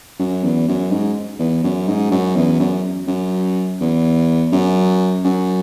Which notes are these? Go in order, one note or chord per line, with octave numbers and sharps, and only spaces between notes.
F#2
E2
F#2
G#2
E2
F#2
G#2
F#2
E2
F#2
F#2
E2
F#2
F#2